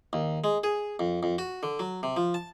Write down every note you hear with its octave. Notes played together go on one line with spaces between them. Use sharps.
D#2
G#3
G#4
F2
F2
F#4
D3
F#3
C3
F3
A5